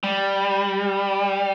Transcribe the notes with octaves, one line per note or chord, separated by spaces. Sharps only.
G3